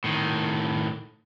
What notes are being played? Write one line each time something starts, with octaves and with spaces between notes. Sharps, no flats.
A2 D#3